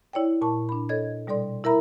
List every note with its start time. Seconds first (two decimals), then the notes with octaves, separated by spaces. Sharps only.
0.13 E4 C#5 D5 G5
0.42 A#2 A5 C#6
0.69 D4 B5
0.89 A4 C#5 D#5 G#6
1.27 B2 G3 A4 D5 C6
1.64 E4 A#4 E5 A#5 B5